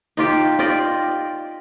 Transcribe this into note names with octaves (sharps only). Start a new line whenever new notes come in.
D#4 F4 G4
F4 G4 D5 D#5